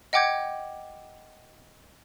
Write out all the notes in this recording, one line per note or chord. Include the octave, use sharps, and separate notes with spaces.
D#5 F#5 G5 D6 G6 G#6